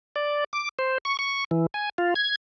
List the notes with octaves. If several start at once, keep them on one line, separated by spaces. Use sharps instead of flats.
D5
D6
C5
C#6
C#6
E3
G#5
F4
G#6